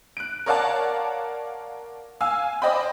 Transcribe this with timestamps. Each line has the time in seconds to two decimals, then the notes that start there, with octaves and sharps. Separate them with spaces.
0.17 F#6 D7
0.46 A#4 C#5 D5 F5 F#5 A5
2.21 F5 G#5 E6
2.62 C5 D5 D#5 G5 B5